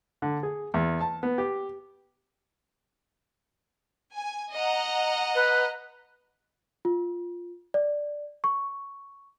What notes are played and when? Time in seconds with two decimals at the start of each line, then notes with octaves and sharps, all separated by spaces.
0.22 D3
0.43 G#4
0.74 E2
1.01 A5
1.23 B3
1.38 G4
4.16 G#5
4.53 D#5 F#5 A#5
5.35 B4
6.85 F4
7.74 D5
8.44 C#6